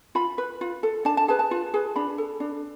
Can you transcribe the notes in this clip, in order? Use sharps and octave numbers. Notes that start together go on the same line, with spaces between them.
F4 B5
B4
F4
A4
D4 A5
A5
G#4 B4 A5
A5
F4
G#4 B4
D4 B5
A4
D4